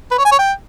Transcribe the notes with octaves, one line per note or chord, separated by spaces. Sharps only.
B4
C#5
G#5
C#5
G5